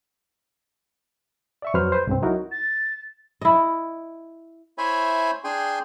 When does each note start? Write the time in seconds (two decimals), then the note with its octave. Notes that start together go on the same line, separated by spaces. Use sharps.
1.62 D5 E5 C#6
1.74 F2 F#3 B4 C5 C6 F6
1.92 B4 C5
2.07 C2 G2 C4
2.22 F#3 D#4 E4 F#4 A#4
2.52 A6
3.41 E4 D#5
4.78 E4 C5 C#5 E5 G#5 B5
5.44 D4 G#4 G5 G#5 C6